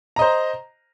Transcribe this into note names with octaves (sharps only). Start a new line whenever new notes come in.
C5 D#5 A#5